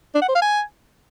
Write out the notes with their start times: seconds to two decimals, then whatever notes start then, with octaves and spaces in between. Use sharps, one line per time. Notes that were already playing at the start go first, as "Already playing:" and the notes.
0.15 D4
0.22 F#5
0.28 C5
0.35 F5
0.42 G#5